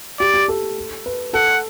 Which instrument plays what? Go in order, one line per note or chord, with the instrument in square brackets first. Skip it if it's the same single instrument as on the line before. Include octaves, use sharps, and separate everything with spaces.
[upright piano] G4 [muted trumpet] D5
[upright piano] G4
A4
B4
[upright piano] A4 [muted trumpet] F#5